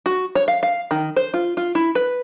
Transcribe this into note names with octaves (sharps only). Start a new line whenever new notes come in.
F#4
C#5
F5
F5
D#3
C5
F4
F4
E4
B4